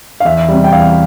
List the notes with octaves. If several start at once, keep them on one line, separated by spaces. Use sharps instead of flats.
F5
E2 E5
C3 G3
G5
E2 F5